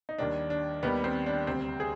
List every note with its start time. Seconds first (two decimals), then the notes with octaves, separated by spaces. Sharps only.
0.09 D#4
0.18 D#2 D#3 G3 D4
0.50 D4
0.82 D#2 D#3 G3 B3
1.04 C4
1.26 D4
1.47 D2 C3 G3 C4
1.80 G#4